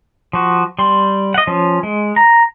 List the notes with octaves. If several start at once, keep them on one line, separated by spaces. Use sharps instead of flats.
F3 F#4
G3 C6
D#5 F#5
F3 C#4
G#3
A#5